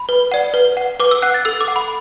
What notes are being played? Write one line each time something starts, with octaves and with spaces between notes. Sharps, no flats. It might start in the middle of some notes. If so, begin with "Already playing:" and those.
Already playing: B5
B4
D5 F#5
B4
F#5
B4 D6
E6
F#5 F#6
A6
A4 E6
D6
F#5
B5